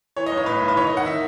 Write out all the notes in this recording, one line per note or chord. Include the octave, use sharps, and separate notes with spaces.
E3 C#5
D#5
B1
C#5
A2 B4
B1
B4
D#2 C#5
D#5
D#3
F#5
D#3 E5